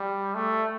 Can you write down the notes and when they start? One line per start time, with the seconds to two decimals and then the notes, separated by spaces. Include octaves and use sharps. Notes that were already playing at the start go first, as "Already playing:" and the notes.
Already playing: G3
0.35 A3